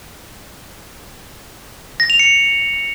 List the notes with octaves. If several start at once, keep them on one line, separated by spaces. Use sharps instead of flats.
A#6
F7
C#7